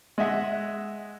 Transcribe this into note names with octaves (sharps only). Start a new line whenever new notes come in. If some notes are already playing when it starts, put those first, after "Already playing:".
G#3 D#5 E5 F#5